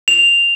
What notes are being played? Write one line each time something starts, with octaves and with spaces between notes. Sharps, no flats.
F7